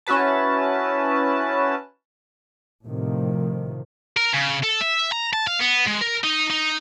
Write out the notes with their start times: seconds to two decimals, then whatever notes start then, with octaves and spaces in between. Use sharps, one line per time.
0.07 C#4 E4 F#4 B4 A5
2.85 A2 C3 D#3 F3
4.17 A#4
4.33 C#3
4.63 A4
4.81 E5
5.12 A#5
5.33 A5
5.47 F5
5.59 B3
5.86 G#3
6.01 A#4
6.24 D#4
6.51 D#4